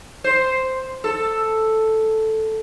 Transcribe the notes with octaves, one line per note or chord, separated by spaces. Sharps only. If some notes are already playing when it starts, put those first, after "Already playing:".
C5
A4